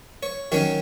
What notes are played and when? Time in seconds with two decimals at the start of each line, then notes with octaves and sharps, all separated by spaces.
0.23 C#5
0.52 D#3 F#3 C#4 C#5